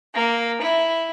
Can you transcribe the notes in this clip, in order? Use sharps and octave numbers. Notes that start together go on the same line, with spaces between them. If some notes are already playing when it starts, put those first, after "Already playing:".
A#3
E4